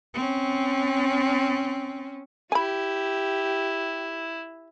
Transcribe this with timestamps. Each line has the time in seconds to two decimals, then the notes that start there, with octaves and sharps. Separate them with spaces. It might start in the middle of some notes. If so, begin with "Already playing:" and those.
0.14 C4 C#4
2.52 E4 G4 G#5 B5